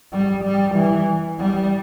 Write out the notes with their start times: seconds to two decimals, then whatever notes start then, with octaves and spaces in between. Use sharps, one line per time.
0.12 G3
0.44 G3
0.75 E3
1.39 G3